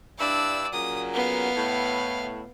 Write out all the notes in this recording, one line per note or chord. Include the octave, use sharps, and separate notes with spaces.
G2 D4 E4 D5 E6
A#2 C#3 F#3 D#6
B3 F5
A2